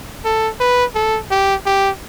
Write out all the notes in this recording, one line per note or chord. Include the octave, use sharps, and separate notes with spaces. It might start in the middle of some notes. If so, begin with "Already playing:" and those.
A4
B4
A4
G4
G4